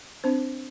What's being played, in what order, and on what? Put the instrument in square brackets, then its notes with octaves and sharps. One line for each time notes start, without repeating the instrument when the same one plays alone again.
[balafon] C4 D4 C5